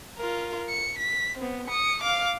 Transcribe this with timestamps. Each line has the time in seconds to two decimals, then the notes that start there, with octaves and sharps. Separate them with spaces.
0.18 F4 A#4
0.69 C#7
0.98 B6
1.38 B3 C4
1.67 D#6 C#7
2.02 F5 D6